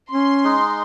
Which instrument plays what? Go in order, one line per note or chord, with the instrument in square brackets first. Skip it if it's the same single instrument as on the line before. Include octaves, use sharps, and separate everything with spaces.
[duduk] C#4 [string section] C6
[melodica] G#3 D#4